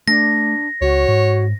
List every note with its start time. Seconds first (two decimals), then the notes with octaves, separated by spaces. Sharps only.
0.08 A3 D4 A#6
0.81 C#2 F#4 C#5
1.08 G#2